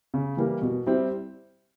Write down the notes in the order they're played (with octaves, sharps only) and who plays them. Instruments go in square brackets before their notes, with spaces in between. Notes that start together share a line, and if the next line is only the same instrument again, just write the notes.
[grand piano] C#3
E3 G3 A#3
B2
G3 C4 E4